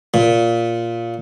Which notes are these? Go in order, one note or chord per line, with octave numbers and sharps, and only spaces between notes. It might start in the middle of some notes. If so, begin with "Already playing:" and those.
A#2